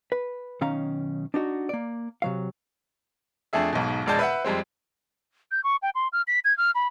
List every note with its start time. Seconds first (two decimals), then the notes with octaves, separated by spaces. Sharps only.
0.12 B4
0.61 B1 D#3 C#4 F5 A#5
1.34 D4 D#4 F#4
1.69 A#3 D5
2.22 C3 F#3 F5
3.53 F2 A3 D4 G#4 E5
3.73 B1 G#2 B2
4.06 E1 A#1 G#3 D5 A5 G6
4.19 B4 E5 F#5
4.45 F2 G3 G#3 C4
5.51 G6
5.64 C#6
5.82 G5
5.95 C6
6.13 F6
6.27 B6
6.45 G#6
6.58 F6
6.75 B5